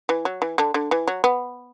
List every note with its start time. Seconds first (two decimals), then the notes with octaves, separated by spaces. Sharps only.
0.09 E3
0.25 F#3
0.42 E3
0.58 D3
0.74 D3
0.91 E3
1.07 F#3
1.24 B3